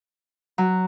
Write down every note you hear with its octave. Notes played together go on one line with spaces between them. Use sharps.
F#3